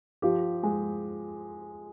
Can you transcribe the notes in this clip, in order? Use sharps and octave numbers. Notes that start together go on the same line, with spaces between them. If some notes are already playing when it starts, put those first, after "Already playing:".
F3 G4
G#3